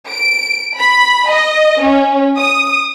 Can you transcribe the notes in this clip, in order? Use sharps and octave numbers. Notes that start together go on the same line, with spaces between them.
D7
B5
D#5
C#4
D#6